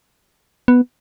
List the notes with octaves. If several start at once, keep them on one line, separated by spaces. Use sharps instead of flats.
B3